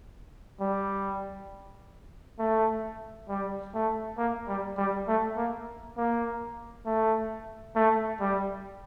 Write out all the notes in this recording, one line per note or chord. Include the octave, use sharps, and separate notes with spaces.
G3
A3
G3
A3
A#3
G3
G3
A3
A#3
A#3
A3
A3
G3